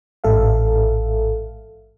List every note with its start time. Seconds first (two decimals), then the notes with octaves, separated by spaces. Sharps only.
0.24 A1 G#2 A4 E5 F5